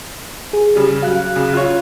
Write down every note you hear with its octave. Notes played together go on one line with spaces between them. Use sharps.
G#4
C#3 G3
F#3 F5 F#6
C#3
F4 C#5